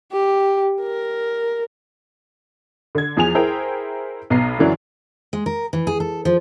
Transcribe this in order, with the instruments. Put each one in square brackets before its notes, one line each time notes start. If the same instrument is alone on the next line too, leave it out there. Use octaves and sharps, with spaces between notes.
[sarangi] G4
A#4
[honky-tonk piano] D3 G#6
E2 F3 G#4 G#5 F7
E4 G#4 A#4 C5 G5
B1 B2 B3 A#5 C7
F#2 D3 E3 F#3 D4
[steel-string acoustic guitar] G#3
A#4
E3
G#4
A4
F3